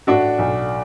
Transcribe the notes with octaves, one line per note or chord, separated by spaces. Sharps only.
A2 D4 F#4
B1